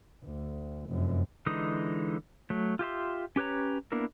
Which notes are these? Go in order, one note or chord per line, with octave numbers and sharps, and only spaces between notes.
D2
F1 F#2
D3 E3 G#3 D#4 D#6
F#3 A3
F4 G4 E5 C6
C#4 G4 B4 C#5 A#5
A#3 B3 D4 E4 A#4